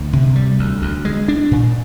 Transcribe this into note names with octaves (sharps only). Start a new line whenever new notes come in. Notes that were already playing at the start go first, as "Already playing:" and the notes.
Already playing: D2
C3
G3
D2
D2
G#3
D4
A#2